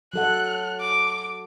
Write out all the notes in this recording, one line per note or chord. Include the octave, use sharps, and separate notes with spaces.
F#3 A4 F#5 F#6
D6